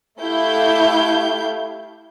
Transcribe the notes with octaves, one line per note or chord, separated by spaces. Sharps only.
A3 E4 G4 F5 G6